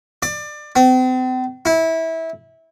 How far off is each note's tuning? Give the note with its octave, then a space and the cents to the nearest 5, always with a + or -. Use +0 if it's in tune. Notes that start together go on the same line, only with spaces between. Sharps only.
D5 +25
C4 -40
E4 -20